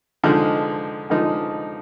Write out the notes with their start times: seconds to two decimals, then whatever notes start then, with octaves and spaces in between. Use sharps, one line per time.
0.23 D3 F3 G#3 D#4
1.10 D3 F3 G#3 D#4